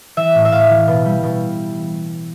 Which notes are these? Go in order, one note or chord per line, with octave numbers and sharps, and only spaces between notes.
E3 E5
A2
E5
A2 F5
E3
B2
G3
B2